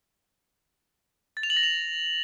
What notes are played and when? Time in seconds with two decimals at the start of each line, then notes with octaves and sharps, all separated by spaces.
1.37 A6
1.43 F7
1.50 F#7
1.57 A#6
1.63 F7